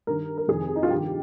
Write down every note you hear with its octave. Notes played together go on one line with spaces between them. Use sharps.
G2 D#3 A#4
A#4
F2 C3 D#3 G#4
D#4
F4
G2 D#3 G4